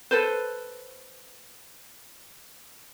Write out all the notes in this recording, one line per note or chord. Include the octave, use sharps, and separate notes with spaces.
A4 B4 C5